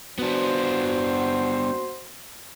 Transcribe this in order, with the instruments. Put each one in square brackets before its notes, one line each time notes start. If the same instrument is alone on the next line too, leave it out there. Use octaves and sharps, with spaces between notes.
[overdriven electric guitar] B3 D4 [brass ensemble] F#4 C5